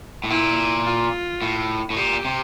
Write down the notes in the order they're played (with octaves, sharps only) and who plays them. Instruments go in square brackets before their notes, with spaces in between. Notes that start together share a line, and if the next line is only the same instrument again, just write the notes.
[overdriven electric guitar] A2
[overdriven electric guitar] A#2 [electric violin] E4
[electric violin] F4
[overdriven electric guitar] A2
A2
[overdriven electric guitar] A#2 [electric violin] G4
[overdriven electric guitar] C3